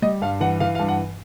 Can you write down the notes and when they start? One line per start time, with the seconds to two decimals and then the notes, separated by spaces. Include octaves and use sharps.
0.02 G3 D#5
0.22 G2 F5
0.41 E3 F#5
0.60 E3 F5
0.75 F5
0.79 G2
0.88 F#5